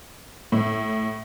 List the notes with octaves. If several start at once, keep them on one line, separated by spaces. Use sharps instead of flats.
A2